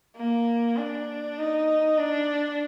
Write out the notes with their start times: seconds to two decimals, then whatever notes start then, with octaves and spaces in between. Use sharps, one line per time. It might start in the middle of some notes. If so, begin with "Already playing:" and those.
0.16 A#3
0.77 D4
1.37 D#4
1.98 D4